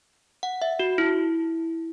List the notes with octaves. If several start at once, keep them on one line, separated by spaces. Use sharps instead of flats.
F#5
E5
F#4
E4